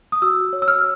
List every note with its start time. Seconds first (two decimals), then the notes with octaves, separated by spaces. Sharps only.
0.12 D#6
0.22 F#4 E6
0.53 C#5
0.62 E6
0.68 F6